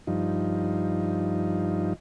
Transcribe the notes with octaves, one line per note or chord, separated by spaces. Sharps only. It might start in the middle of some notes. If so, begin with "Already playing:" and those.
G2 F3 D#4